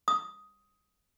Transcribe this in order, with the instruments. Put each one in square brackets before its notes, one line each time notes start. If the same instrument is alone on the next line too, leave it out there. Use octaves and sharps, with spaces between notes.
[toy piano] D#6